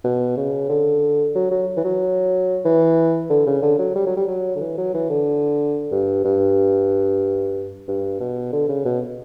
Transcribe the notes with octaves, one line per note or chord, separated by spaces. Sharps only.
B2
C#3
D3
F#3
F#3
E3
F#3
E3
D3
C#3
D3
F#3
G3
F#3
G3
F#3
D3
E3
F#3
E3
D3
G2
G2
G2
B2
D3
C#3
B2